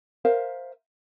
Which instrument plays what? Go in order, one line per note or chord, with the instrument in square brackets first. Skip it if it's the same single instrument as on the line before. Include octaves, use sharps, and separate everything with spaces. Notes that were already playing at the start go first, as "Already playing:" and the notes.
[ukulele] A#4 C5 E5 F5